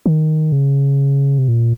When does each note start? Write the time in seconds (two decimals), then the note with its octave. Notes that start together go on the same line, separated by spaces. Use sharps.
0.06 D#3
0.52 C#3
1.38 C3
1.48 A#2